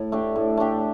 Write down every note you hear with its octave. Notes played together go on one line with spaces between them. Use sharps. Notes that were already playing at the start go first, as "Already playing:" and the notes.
Already playing: A2
A3 D4 G4
A2
A3 D4 G4